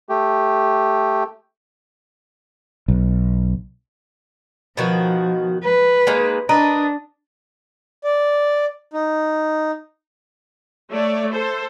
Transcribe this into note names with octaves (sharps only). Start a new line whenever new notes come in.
A3 G4
B1
B2 D#3 F3 F#4
B4
G#3 A#3 D#4
D4 A#4 B4 D#5
D5
D#4
A3 C#5 D5
A4 C5